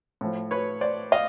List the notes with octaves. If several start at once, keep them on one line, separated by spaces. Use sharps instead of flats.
A2 F3
B4 C#5
C5 D5
D#5 F5